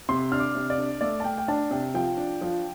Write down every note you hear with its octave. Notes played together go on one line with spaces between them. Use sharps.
C3 C6
D4 F6
D6
C3
D5
D4
A3 D5
A5
A3 G5
G5
D4 A5
C3 G5
F3 G5
D4
F3